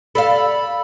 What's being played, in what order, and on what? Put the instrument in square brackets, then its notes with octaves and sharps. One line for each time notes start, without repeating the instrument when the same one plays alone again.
[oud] A4 D5 F5 [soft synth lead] B5